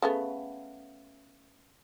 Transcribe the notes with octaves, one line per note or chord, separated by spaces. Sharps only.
C#3 A3 B3